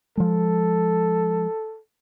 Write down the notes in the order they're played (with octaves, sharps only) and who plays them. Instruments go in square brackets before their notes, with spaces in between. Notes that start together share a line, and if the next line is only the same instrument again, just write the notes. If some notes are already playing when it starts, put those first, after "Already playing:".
[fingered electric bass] F3 G#3 [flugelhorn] A4